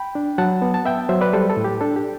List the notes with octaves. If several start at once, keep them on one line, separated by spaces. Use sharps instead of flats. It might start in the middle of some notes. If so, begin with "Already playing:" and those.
Already playing: G5 B5
D4
F#3 F#5 A5
B3
A5
B3 E5 G5
F#3 C5 E5
B4 D5
G3 A4 C5
A4
A2
G4
D4 A4
G4